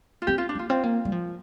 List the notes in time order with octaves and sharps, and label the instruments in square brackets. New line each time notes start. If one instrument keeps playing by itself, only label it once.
[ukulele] F4
[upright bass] C4 [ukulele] G4
[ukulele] F4
D4
[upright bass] A#3 [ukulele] F4
[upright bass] C4 [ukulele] F4
[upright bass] A#3
G3
F3